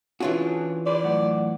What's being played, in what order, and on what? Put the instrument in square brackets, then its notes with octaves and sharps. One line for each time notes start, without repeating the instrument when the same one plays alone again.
[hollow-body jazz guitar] E3 F4 F#4 [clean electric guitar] C#4 D4 G#4
[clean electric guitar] G#4 B4 C5 [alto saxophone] D5
[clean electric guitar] A2 F#3 F#5